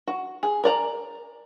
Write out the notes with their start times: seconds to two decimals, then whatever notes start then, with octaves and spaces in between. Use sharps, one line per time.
0.07 F#4
0.43 G#4
0.64 A#4 D5 A#5